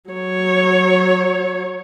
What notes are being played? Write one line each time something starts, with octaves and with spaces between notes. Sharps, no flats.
F#3 C#5